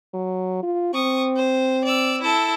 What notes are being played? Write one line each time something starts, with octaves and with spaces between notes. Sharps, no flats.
F#3
F4
C4 C#6 D#6
C5
D5 E6
E4 A4